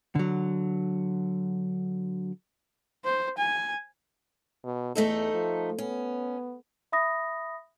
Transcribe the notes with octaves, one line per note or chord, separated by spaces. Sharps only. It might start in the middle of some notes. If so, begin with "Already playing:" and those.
D3 F#3
C5
G#5
B2
E2 A3 D#4 A4
F3
B3 C#4
E5 B5 D#6 A#6